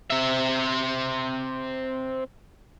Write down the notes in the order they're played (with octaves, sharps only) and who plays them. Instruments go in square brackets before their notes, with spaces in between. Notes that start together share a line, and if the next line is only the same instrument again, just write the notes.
[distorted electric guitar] C4 E5